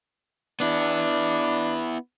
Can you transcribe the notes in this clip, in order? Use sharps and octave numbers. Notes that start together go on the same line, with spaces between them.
B3 D4 E4